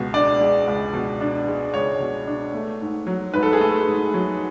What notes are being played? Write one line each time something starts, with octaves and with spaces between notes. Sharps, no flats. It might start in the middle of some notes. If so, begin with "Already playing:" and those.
Already playing: C#2 B2 G#3
D4 D5
G#3
C#2
B2
D4
G#3
C#2 C#5
B2
D4
A3
G#2
F#3
G#2 B4
A4
G#4
A3 A4
G#2
F#3